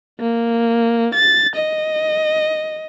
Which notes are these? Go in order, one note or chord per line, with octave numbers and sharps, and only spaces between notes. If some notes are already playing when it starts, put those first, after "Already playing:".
A#3
A6
D#5